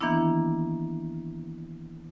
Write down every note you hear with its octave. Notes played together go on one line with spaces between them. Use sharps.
D#3 E3 A#3 B3 D4 E4